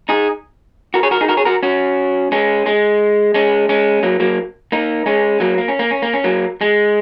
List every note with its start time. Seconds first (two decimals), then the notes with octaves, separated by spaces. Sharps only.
0.09 D#4 G#4
0.94 F#4 A#4
1.03 G#4 C#5
1.11 F#4 A#4
1.21 D#4 G#4
1.28 F#4 A#4
1.37 G#4 C#5
1.45 F#4 A#4
1.63 C#4 F#4
2.32 G#3 C#4
2.66 G#3
3.34 G#3 C#4
3.69 G#3 C#4
4.03 F#3 A#3
4.20 F#3 A#3
4.72 A#3 D#4
5.06 G#3 C#4
5.40 F#3 A#3
5.58 A#3
5.68 C#4
5.79 A#3
5.91 C#4
6.02 A#3
6.14 C#4
6.24 F#3 A#3
6.61 G#3